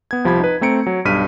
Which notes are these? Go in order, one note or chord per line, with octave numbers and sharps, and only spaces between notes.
B3 G#6
C2 F3 G4 B5 G#6
D#4 B4
A3 C4 A#5 C#7 D7
F#3
B1 G2 G4 F6 B6 D#7